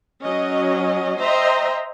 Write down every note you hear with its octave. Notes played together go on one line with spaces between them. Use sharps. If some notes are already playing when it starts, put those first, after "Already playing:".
F#3 C#4 D#5
C5 D#5 E5 G5 A#5 C6